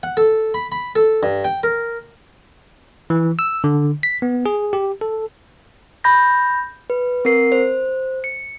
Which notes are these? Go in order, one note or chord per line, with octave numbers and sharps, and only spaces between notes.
F#5
A4
B5
B5
A4
G2
G5
A#4
E3
E6
D3
B6
B3
G#4
G4
A4
B5 G6 A#6
B4
C4 A#4 C7
C5
C#7